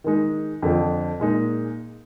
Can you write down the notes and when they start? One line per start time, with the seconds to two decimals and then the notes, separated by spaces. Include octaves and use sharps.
0.04 D#3 G#3 D#4
0.62 F2 D3 F3
1.20 A#2 G#3 D#4